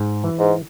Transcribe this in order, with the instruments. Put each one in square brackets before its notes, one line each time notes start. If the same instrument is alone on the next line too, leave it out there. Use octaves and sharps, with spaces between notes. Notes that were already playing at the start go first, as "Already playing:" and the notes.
Already playing: [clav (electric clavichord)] G#2
E3
[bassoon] G#2